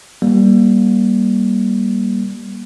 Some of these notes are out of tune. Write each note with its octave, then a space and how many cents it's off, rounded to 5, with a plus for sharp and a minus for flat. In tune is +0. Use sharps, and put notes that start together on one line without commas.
G3 +0 A#3 +25